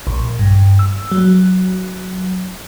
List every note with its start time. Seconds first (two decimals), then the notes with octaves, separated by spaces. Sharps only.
0.07 A#1
0.39 G2
0.79 E6
1.12 F#3